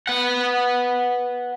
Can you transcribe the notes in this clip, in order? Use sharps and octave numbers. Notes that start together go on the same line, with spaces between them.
B4 F#5